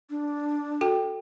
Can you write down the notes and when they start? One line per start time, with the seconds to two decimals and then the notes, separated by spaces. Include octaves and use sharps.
0.10 D4
0.81 F#4 A4 G5